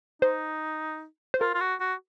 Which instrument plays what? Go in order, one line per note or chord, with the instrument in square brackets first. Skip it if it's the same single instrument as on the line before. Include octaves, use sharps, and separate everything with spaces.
[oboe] D#4 [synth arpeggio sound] C5
[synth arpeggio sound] C5
[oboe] F4 [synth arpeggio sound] A#4
[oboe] F4
F#4
F#4